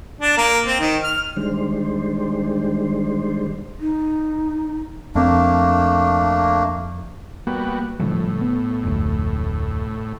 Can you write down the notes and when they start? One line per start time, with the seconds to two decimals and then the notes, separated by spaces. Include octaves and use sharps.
0.21 D4
0.37 A#3
0.67 C4
0.80 D#3
1.04 F6
1.37 D#3 G3 G#3 D4 C5
3.80 D#4
5.15 F2 A3 A#3 C4 D4
7.47 G3 A#3 B3 F#4
8.00 A2 C#3 F3 G3
8.41 B3
8.83 F1 D2